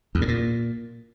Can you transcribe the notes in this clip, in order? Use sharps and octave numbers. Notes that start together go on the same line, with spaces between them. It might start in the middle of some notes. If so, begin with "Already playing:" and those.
E2
A2
A#2